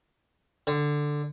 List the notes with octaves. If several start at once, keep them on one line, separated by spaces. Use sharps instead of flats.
D3